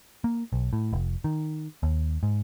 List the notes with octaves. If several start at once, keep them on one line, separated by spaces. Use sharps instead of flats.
A#3
B1
A2
F1
D#3
D#2
G#2